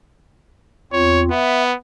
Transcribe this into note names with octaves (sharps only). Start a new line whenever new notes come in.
E2 C4 F4 C#5
B3 E5